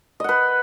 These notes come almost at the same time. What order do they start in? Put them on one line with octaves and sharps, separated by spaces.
D#5 F#5 B4